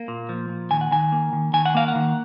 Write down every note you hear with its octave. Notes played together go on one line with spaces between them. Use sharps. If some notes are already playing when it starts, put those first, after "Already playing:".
Already playing: A#3
A#2
F3
A#2
D#3 G#5
F#5
D#3 G#5
A#3
D#3
D#3 G#5
F#5
A#3 F5
F#5
D#3